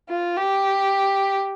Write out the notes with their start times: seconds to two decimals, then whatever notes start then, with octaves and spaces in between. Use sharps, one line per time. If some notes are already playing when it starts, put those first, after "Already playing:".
0.09 F4
0.36 G4